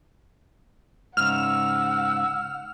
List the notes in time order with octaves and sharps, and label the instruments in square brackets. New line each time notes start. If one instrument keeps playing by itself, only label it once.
[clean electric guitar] G#2 C#3 [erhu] F#5 [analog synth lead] E6 [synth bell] F6